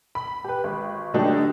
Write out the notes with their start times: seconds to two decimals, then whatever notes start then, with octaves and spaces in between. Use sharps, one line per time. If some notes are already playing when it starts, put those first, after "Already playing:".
0.15 B5
0.44 G4 B4
0.64 G#1
1.14 D3 F#3 A3 D4 D#4 G4